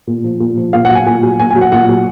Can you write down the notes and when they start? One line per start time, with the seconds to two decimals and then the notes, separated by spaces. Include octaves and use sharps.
0.07 A#2
0.24 F3
0.40 A#2
0.58 F3
0.73 A#2 F5
0.85 F#5
0.89 F#3
0.95 G#5
1.06 A#2 G#5
1.23 F#3
1.39 A#2 G#5
1.51 G#5
1.56 F#3
1.61 F#5
1.72 A#2 F#5
1.89 F#3